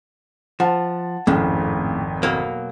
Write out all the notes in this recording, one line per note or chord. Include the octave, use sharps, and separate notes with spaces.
F3 F#5 A5
G#1 F2 A2 C#3
B2 F#3 A#3